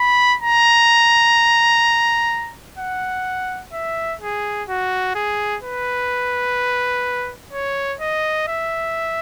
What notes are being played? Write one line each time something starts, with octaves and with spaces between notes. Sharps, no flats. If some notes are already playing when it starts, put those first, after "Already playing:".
Already playing: B5
A#5
F#5
E5
G#4
F#4
G#4
B4
C#5
D#5
E5